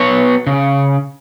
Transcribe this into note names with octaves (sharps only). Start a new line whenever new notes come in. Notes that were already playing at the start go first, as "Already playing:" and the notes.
Already playing: F#3 B3 F#4 C#5
C#3